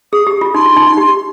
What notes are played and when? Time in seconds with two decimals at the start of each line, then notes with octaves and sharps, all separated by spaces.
0.12 G#4 D#6
0.27 G4
0.41 F4
0.54 D#4 C6
0.66 F4
0.76 D#4
0.87 D#4
0.97 G4